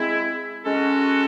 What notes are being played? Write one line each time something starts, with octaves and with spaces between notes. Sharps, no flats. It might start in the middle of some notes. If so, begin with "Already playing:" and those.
Already playing: G#3 C4 E4
G#3 C#4 F#4 A4